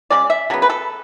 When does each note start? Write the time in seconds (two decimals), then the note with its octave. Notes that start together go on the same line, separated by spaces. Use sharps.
0.10 C#3 G#3 D5
0.30 E5
0.50 C#3 F#3 B3
0.62 B4
0.69 A4